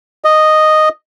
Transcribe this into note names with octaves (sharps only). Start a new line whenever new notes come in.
D#5